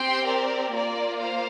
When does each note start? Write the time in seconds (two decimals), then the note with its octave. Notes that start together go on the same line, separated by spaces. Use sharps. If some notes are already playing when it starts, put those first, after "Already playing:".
Already playing: C4 G4 G5 C6
0.26 A#4 D5
0.72 A#3 F4 A#4 D5
1.18 C5 F5